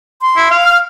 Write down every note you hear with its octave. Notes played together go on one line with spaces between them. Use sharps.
C6
E4
F5
F6